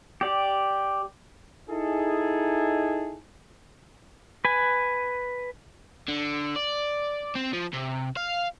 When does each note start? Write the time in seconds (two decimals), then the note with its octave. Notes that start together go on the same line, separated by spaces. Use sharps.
0.21 G4 D5
1.70 D#4 E4 G#4 A4
4.45 B4 G#5
6.08 D3
6.56 D5
7.35 C4
7.53 F3
7.74 C3
8.17 F5